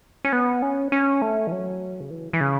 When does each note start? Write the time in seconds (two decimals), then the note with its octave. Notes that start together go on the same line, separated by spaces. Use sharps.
0.25 C#4
0.33 B3
0.62 C#4
0.92 C#4
1.22 A3
1.47 E3
1.52 F#3
2.00 C#3
2.10 E3
2.33 E3
2.41 C#3